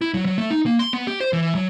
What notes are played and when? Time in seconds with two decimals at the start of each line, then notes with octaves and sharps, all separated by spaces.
0.01 E4
0.14 F#3
0.25 F#3
0.38 A3
0.51 D#4
0.66 A#3
0.79 C6
0.93 B3
1.07 G4
1.21 C5
1.33 E3
1.55 F#3